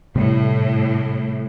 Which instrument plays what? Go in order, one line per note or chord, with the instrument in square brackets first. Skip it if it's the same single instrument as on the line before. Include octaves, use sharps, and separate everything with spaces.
[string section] A2 [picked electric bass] C3 G3 A3